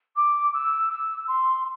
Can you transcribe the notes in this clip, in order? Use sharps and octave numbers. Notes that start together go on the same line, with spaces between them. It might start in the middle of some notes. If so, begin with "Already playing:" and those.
D6
E6
E6
C6